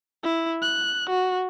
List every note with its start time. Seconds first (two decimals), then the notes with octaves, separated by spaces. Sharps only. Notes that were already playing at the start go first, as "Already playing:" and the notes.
0.23 E4
0.62 F#6
1.10 F#4